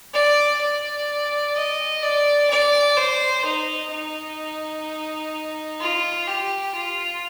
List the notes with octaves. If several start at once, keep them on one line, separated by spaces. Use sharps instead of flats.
D5
D5
D#5
D5
D5
C5
D#4
D#4
F4
G4
F4